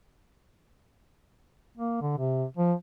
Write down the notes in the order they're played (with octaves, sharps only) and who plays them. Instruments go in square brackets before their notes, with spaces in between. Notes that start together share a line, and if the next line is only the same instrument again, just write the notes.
[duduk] A#3
D3
C3
F3